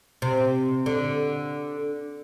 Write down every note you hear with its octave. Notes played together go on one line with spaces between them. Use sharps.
C3
D3